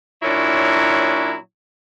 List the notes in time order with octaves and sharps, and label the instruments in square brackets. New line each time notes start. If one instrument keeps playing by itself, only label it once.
[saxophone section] A#2 F#3 C#4 D4 E4